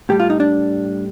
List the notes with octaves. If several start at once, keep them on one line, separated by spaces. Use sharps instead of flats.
A2 G3 G4
F4
D#4
D4